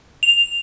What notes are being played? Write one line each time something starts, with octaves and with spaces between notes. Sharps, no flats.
F7